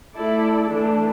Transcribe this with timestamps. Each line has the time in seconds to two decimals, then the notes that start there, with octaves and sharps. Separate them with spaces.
0.15 A3 E4 A4 D5
0.70 E3 A3 D4